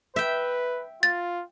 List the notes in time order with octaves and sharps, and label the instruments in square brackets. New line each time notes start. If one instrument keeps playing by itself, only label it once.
[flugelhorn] B4 [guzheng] E5 G5
[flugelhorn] F4 [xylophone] A6